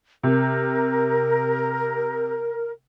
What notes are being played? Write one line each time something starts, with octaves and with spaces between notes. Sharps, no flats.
C3 A#4